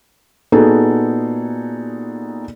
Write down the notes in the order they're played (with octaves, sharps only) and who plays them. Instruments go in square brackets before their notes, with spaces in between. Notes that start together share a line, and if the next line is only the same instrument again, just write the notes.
[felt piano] A#2 B3 D#4 F#4 G#4 A4